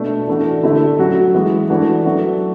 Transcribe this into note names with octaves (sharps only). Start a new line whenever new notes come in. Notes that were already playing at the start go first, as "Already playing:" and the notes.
Already playing: B2 A3 D4
E3 A3 D4 F#4
D3 A3 E4
F#3 C#4 F#4
E3 G#3 B3 F#4
E3 A3 D4 F#4
F#3 A3 D4 F#4